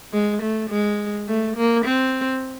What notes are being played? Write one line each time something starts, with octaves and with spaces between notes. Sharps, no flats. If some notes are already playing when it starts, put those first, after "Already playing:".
G#3
A3
G#3
A3
A#3
C4